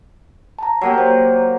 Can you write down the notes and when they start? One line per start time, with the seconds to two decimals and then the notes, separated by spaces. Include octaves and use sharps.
0.59 A5 A#5
0.81 F#3 A#3 G4
0.98 C5